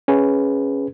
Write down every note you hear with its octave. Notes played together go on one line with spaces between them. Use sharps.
C#4 G#4 B4